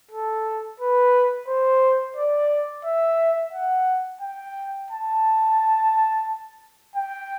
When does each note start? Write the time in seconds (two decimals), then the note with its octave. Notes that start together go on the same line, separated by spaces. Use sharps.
0.11 A4
0.80 B4
1.48 C5
2.17 D5
2.85 E5
3.53 F#5
4.21 G5
4.91 A5
6.96 G5